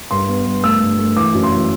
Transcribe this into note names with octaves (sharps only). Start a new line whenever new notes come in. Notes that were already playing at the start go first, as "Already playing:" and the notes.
G2 C6
B3
G2
A3 E6
G2
A3
E3 D6
F#2
C6
E3